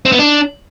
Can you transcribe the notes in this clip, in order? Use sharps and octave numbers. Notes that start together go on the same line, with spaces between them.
C4
B3
D4